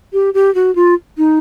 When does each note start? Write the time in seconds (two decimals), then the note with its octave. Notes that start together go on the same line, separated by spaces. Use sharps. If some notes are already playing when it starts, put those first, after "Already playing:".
0.13 G4
0.34 G4
0.55 F#4
0.75 F4
1.18 D#4